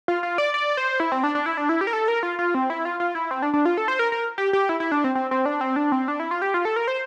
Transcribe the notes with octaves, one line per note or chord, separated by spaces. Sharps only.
F4
F4
D5
D5
C5
E4
C4
D4
D4
E4
D4
E4
G4
A#4
A4
A#4
F4
F4
C4
E4
F4
F4
E4
C4
D4
D4
F4
A4
C5
A#4
A#4
G4
G4
E4
E4
D4
C4
C4
C4
D4
C4
D4
C4
D4
E4
F4
G4
F4
A4
A#4
C5